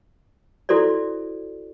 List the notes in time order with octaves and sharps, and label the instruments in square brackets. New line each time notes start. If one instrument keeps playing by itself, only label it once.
[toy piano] E4 F#4 A4 C5 D5